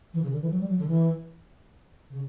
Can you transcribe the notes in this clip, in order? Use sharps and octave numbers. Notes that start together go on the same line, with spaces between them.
E3
C#3
D3
E3
F#3
G3
F#3
D3
E3
C#3